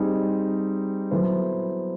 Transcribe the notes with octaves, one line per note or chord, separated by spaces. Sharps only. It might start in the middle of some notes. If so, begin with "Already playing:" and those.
Already playing: G3 C4 D#4 G#4
F#3 B3 E4 A4 C5